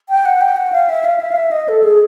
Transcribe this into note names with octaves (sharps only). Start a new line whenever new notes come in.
G5
F#5
G5
F#5
F5
E5
F5
E5
F5
E5
D#5
A4
G#4